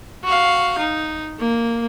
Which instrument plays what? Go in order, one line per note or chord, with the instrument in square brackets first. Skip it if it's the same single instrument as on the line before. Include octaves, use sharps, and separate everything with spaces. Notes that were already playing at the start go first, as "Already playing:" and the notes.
[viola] F#4 F5
D#4
A#3